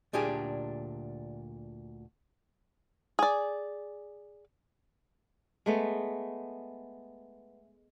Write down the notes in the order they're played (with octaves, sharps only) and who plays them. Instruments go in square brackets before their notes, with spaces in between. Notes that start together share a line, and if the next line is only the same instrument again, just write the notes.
[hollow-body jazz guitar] D2 A#2 D4 G4 G#4
[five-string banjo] G#4 D5
[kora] G#3 A3 B3